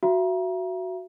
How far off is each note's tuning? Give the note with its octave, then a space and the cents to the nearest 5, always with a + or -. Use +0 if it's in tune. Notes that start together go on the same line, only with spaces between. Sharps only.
F#4 +0 E5 +35 A#5 +30